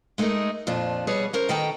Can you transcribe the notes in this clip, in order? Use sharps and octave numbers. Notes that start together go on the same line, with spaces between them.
G#3 A3 D#4 G#4 A#4
F2 A#2 F3 D4
B2 G3 G#4 B4 C#5
C#4 A#4 C5
B2 D#3 A4 G5 A#5